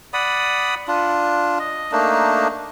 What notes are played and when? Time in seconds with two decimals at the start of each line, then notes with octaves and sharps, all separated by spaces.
0.14 D5 F#5 B5 D#6
0.88 D4 F4
1.59 D#5
1.92 A3 A#3 D4 D#4